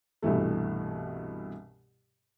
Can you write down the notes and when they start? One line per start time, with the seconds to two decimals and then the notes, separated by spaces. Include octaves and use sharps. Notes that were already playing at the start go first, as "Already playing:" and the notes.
0.22 C2 G2 B2 E3 A3